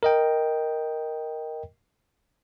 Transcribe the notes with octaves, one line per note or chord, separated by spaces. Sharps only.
A#4 D#5 G5